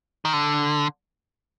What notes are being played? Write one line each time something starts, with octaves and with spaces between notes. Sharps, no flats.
D#3
D3